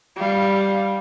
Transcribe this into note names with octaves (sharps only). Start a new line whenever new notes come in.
G3 F5